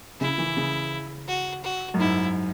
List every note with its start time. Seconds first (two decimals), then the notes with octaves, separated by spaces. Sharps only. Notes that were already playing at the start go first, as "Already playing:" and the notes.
0.20 C#3 E4
0.38 E3
0.57 C#3
1.28 F#4
1.64 F#4
1.94 F#2
1.99 G#2 E4